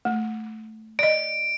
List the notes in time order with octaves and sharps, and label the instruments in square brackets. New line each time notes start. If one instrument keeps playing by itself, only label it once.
[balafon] A3
[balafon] D5 D#5 [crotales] D7